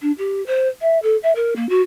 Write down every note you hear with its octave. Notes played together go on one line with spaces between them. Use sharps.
D4
G4
C5
E5
A4
E5
A#4
A#3
F#4